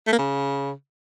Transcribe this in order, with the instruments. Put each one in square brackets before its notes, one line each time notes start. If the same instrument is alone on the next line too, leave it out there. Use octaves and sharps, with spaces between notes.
[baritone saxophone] A3
A#3
C#3